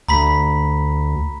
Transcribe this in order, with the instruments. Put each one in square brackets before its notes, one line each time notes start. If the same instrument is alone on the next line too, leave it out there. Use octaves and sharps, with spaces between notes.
[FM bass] D2 [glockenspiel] A#5 B5 B6